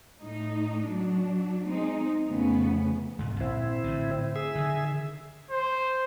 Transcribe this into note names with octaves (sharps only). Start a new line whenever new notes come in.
A2 D#4
F#3 D4
G#3 C4 D#4
F2 C#3 A3 B3
D#1 G#2 B2
A#1 C4 E4
A2 D3
G#4 E5
D3 D#3
C5